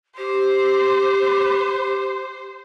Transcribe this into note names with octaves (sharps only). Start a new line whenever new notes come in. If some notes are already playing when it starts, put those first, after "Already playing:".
G4 C5